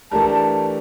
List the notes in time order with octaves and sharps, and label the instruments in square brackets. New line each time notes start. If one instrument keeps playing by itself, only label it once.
[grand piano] E3 A3 D4 G4 A#4 [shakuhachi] A5
[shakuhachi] A5